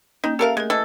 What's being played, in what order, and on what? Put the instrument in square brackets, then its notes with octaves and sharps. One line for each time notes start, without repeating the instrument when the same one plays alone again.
[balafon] A#3 C#4 [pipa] D#4
[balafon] G4 E5 [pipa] A4 A#4 F5
[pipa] G#3 [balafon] A3 A#4
[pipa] E3 A4 [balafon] D#5